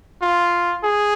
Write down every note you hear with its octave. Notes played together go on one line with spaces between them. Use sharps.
F4
G#4